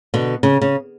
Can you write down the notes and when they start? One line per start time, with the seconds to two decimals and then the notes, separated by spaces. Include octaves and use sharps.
0.14 B2 D3
0.43 C#3
0.62 C#3